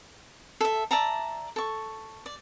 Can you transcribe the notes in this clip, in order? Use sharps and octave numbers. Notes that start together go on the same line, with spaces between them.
A4 E5
D5 E5 A5 A#5
A4 C#6
D5